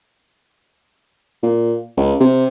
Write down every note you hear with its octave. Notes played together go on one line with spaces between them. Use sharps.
A#2
C#2
C3